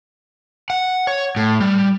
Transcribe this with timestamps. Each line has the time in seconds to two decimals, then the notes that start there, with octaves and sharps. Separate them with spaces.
0.70 F#5
1.07 C#5
1.36 A2
1.60 G3